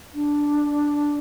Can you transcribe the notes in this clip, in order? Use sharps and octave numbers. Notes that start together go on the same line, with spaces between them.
D4